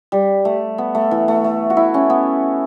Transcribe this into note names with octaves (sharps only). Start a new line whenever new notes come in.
G3
A3
B3
A3
E3
A3
A3
F#4
E4
C#4
B3